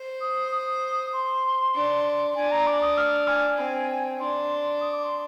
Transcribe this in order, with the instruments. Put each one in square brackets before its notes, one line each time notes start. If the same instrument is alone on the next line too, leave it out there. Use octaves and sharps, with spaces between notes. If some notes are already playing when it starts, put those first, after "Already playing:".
Already playing: [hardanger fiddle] C5
[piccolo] D#6
D#6
C6
[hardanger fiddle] D4
[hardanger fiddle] D4 [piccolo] G#5
[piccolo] A#5
D6
D#6
F6
G#5
[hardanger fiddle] C4
[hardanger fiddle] D4 [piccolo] C6
[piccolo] D#6
D6
C6